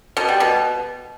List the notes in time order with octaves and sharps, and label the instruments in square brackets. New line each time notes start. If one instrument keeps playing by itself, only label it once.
[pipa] B2
G3
B2